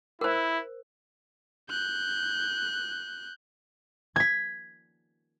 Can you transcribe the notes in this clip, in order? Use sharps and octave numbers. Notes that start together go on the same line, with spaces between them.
E4 A#4 C5
F#6 G6
G#6 B6